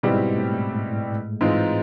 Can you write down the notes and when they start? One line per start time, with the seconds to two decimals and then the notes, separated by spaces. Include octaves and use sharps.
0.03 G#2 B2 G3 G#3 C4 E4 G4
0.38 A2 A3
1.41 G#2 E3 G#3 C4 F4